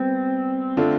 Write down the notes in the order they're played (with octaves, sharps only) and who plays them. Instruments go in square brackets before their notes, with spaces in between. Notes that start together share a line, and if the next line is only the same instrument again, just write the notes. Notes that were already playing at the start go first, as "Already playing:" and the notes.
Already playing: [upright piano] G3 B3 [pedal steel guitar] C4
[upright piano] D3 A3 D4 F4